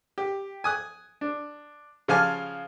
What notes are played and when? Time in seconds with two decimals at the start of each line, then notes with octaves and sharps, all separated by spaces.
0.18 G4
0.64 G#5 D#6 F#6
1.21 D4
2.08 C#3 F3 F5 G#5 A5 F6